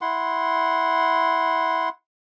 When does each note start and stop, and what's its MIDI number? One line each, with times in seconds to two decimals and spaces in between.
0.01 1.89 64
0.01 1.89 78
0.01 1.89 84